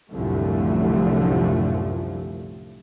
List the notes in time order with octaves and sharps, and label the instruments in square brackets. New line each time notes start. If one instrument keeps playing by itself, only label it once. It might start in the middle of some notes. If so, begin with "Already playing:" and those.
[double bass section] C2 F#2 A2 D3 F3 A3